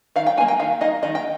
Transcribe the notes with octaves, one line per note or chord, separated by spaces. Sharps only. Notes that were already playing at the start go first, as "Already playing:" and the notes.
D#3 F5
G5
D#4 G#5
A#3
G5
D#3 F5
A#3 D#4 D#5
D#3 D#5
G5